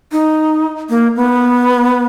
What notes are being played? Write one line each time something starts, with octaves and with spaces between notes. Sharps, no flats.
D#4
A#3
B3